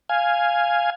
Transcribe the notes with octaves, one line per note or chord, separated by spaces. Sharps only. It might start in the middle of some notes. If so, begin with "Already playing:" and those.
F5 G#5